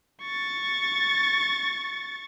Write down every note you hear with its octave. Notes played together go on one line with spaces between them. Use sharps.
C#6 A6